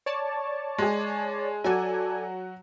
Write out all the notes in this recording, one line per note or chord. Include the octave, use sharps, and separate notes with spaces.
C#5 D5 A5
G#3 G#4
F#3 F#4 A4 D5 G#5